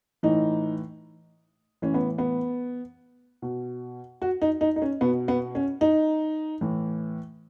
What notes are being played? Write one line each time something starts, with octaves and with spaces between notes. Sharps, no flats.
A2 E3 D#4
A2 E3 C#4
B3
B3
B2
F#4
D#4
D#4
D#4
C#4
B2 B3
B3
C#4
D#4
A2 E3